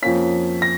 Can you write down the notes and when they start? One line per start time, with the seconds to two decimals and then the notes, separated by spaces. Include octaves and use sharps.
0.02 F2 F3 A#3 C#4 B6
0.62 A#6